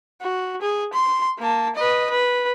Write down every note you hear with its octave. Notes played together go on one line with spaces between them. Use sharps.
F#4
G#4
C6
A#3 A5
B4 D#5
B4